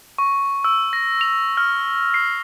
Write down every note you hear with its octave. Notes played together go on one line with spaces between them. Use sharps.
C#6
E6
A#6
F7
F6
C7